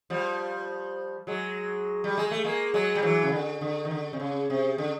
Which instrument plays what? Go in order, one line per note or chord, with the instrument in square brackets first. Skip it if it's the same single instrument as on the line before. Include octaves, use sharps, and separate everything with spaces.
[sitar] F3 G3
F#3 G#3
G3
G#3
A3
G#3 A#3
F#3 G#3
G3
E3 F#3
C#3
D3
D3
D#3
D3
C3
C#3
C3
D3